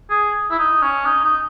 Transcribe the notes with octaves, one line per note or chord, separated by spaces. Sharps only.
G#4
E4
D#4
C#4
D#4
D#4